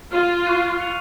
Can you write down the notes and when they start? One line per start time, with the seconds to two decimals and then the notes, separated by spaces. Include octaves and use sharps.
0.12 F4 F6 C7 D#7
0.46 C#6 F#6 C7 D#7
0.80 F#6 C#7 F7